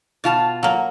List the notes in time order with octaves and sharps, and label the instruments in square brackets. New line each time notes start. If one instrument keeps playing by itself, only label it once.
[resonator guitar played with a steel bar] B2 F4 A5
[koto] F#3 A#3